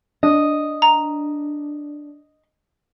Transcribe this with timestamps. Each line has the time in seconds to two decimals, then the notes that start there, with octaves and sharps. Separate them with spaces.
0.23 D4 D#5
0.82 A#5